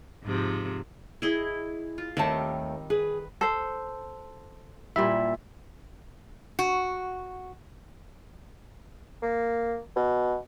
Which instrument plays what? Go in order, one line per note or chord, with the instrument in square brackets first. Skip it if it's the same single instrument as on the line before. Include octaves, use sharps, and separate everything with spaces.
[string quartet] G#2 C3 F3
[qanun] E4 G#4 D#5
F4
[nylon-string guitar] D#2 A3 A5 [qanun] D#3 G3 C4
[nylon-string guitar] G#4 [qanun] B4
[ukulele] A4 C5
[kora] A#2 G3 E4 [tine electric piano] E5
[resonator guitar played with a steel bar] F#4
[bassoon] A#3
B2